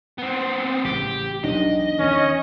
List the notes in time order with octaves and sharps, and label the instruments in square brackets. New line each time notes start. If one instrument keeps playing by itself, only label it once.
[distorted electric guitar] B3 C4
[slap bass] A1 C#3 [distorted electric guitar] G4
[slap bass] E1 B1 [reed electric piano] D4 D#4 [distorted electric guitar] D#5
[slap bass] E2 D#3 [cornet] C#4